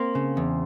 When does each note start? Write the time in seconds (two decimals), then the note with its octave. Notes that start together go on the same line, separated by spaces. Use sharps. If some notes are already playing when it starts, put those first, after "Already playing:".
Already playing: A#3 C4
0.15 C#3
0.37 E2